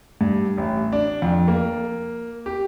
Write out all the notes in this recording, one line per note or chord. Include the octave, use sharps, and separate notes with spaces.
G2
A1
D4
F2
A#3
G4